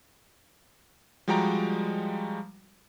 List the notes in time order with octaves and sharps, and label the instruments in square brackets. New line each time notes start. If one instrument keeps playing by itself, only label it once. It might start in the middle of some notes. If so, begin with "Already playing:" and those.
[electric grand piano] F3 G3 G#3 F#4 G5 A#5